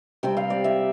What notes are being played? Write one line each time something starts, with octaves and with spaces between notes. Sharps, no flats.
C3 G3 C4 G5
F5
D5
E5